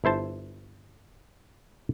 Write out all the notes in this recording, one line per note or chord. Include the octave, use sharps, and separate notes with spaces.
G1 E4 C5 A5